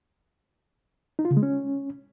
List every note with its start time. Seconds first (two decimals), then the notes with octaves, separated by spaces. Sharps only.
1.19 D#4
1.25 F4
1.31 C#3
1.37 G#3
1.43 C#4